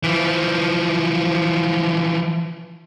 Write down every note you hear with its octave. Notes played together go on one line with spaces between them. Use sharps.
E3 F3